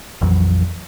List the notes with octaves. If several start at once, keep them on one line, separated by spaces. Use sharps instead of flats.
A#1 F2 E3 F#3